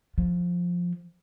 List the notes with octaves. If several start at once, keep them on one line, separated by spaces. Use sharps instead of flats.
F3